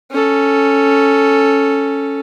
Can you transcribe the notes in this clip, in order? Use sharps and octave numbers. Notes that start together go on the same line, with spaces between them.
C#4 A4